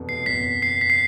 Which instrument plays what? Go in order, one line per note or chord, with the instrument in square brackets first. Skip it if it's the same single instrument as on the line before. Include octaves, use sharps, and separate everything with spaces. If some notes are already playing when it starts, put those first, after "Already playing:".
Already playing: [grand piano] F1 E2 B2
[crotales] C7
[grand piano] F#1 E2 B2 [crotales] B6
[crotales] C7
B6
C7